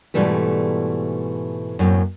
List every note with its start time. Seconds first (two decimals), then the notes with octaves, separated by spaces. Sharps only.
0.14 G#2 B2 E3 G3 A3 B4
1.79 F#2 A2 A#3 C4